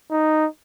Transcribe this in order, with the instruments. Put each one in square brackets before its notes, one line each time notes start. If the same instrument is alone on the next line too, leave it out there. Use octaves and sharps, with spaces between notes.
[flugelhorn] D#4